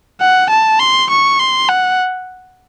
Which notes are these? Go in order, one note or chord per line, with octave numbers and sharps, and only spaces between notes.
F#5
A5
C6
C#6
C6
F#5